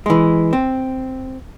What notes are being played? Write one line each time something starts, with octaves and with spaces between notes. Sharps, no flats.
E3 G#3
C4